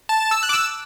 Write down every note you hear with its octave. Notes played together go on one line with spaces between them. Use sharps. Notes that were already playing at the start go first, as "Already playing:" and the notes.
A5
E6
F#6
D6
E6